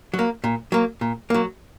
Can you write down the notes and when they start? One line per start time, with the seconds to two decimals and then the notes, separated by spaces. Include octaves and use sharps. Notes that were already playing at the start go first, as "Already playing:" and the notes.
0.14 F#3
0.19 A#3
0.44 A#2
0.72 F#3 A#3
1.01 A#2
1.30 F#3 A#3